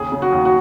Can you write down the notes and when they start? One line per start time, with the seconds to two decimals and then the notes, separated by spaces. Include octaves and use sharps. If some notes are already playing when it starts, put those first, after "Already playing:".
Already playing: D#2 C#3 G#4
0.12 C#3
0.22 F#4
0.32 D#2
0.45 F#4